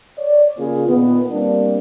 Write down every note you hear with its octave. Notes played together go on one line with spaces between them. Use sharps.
C#5 D5
C#3 A#3 F4 G#4
A#2 D#3 B3
G3 A#3 C4 D4